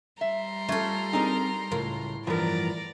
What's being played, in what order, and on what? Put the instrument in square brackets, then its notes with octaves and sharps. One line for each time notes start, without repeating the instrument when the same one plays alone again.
[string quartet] G3 A#5 C6 [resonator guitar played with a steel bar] E5
[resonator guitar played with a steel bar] A3 C#4 [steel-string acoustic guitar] F4 A4
[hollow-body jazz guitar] C4 D4 G#4 [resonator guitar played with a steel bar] D#4 A#4
[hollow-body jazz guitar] C#2 A#4 [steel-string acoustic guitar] A2 [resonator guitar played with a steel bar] F4
[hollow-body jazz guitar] G2 E3 F3 [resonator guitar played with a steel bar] B3 A#4 [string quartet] D5 A#5